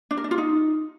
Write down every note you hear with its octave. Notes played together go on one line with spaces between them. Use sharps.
D4
A#4
D4
F4
D#4